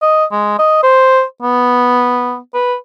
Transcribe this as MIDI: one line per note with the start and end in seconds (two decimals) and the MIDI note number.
0.02 0.25 75
0.32 0.58 56
0.59 0.78 75
0.83 1.23 72
1.42 2.37 59
2.54 2.75 71